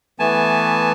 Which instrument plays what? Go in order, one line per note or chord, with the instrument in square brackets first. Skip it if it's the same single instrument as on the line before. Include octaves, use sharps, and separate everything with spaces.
[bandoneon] E3 A3 B3 G#5 A5